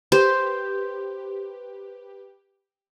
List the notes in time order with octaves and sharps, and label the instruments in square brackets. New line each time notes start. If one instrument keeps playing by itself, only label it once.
[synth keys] G4 B4 [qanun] C5